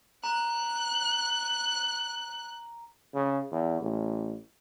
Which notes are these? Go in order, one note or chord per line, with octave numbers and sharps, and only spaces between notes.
A#5 F#6
C#3
E2
A1